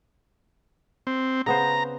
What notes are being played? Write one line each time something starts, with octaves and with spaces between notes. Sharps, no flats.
C4
C#3 B3 C5 A#5